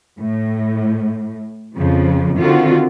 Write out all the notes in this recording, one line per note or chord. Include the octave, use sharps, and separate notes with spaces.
A2
F2 C#3 F3
D3 D#3 C4 F4 F#4